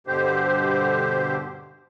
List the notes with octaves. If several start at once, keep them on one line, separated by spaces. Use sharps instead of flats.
G2 B2 D3 G4 C5